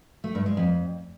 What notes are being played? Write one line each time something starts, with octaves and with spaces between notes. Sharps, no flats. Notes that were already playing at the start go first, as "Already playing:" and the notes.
A3
G2
G#3
F2